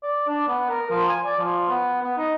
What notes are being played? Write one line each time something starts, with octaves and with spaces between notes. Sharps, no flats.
D5
D4
B3
A#4
F3
G#5
D5
F3
B3
B3
D#4